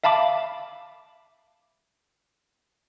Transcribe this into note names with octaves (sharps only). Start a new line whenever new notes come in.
E5 F5 A5 B5 D6